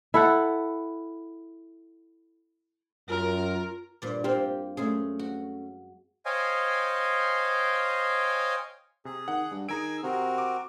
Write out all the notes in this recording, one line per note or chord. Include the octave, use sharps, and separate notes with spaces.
E4 A4 F#5
F#2 F4 A#4
G2 A#2 D5
A#3 C4 F4 G4
F#2 G#3 A3 C#4 G#4
F#4
C5 C#5 D#5 F5 G5 G#5
C3 G#4
D#3 F#5
G2
D#3 G#4 G#5 A#5 E6 D7
C3 C4 F#4 A#4
D6